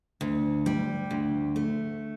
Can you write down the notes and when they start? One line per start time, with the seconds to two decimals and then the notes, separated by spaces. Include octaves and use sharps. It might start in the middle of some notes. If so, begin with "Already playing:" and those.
0.21 D2
0.66 G3
1.11 D2
1.56 A3